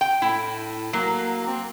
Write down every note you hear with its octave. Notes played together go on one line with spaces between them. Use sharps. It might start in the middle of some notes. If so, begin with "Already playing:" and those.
G5
A2 E4
F#3 A#3
C4